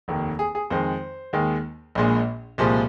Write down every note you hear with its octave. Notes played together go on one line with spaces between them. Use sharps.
F1 D#2 D#3
G#4
G#4
F2 D#3 G#3 C5
D#2 D#3 G#3
A#1 A#2 G#3
C2 A#2 F3 G#3